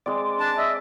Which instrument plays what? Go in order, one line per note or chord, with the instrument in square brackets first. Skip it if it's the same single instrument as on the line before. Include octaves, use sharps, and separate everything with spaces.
[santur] G#3 C4 [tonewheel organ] D5
[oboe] D4 [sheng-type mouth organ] A5
[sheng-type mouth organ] D#5 [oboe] E5